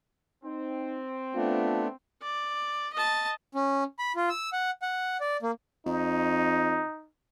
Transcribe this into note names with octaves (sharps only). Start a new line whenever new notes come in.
C4 D#4
A3 B3 D4 F4
D5
D#5 A5
C#4
B5
F4
E6
F#5
F#5
D5
A#3
F2 D#4